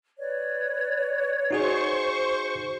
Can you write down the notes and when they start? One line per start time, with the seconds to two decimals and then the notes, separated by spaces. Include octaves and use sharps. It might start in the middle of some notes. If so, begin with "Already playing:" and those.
0.19 B4 C#5 D5
1.51 D#4 F#4 G#4 C5 C#6